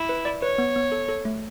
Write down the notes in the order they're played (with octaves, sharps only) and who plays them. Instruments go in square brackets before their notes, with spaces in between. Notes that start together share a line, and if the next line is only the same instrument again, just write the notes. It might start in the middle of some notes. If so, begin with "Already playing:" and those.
Already playing: [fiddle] E4
[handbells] B4
D5
[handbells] B4 [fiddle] C#5
[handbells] B3
B3
A4
A4
A3